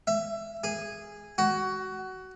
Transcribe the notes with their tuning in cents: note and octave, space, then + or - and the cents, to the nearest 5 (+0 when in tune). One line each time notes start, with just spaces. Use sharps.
E5 +25
G#4 -10
F#4 +20